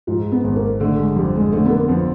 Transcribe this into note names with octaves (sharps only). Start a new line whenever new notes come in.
G#2 F3
B3
G#1
A#3
D3 A3
G#3
F2 G3
G#3
D3 A3
B3
A#3
F2 B3